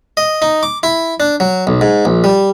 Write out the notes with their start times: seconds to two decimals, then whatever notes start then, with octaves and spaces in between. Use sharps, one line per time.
0.17 D#5
0.42 D#4
0.63 D6
0.83 E4
1.20 D4
1.40 F#3
1.67 B1
1.81 G#2
2.05 A#1
2.24 G3